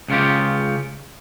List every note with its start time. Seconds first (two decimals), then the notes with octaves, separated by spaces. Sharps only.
0.08 C#2 C#3 F4 G4